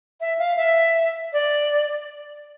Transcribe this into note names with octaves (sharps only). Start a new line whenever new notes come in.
E5
F5
E5
D5